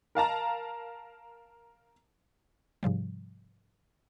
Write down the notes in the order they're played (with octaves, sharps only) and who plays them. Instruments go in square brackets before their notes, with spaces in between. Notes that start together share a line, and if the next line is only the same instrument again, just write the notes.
[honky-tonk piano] A#4 F5 A5 A#5
[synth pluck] G#2 C3 F3 G3